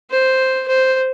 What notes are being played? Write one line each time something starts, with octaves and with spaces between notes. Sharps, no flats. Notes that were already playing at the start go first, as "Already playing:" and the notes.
C5
C5